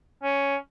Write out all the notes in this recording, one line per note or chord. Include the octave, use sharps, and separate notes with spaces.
C#4